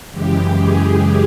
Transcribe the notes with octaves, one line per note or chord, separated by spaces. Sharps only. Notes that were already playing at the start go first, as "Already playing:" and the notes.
F#2 C#3 E3 G#3 G4
G#4